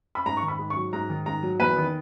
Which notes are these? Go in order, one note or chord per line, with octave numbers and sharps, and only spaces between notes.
B5
G#2 A#5
C#6
D#3
B5
G#2
C#6
F#3
G#2 A#5
D#3
G#2 A#5
F#3
E2 B4
D#3